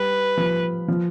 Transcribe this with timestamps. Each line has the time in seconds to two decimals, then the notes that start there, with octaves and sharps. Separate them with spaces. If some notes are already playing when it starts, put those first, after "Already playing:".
Already playing: G3 B4
0.37 F3
0.88 F3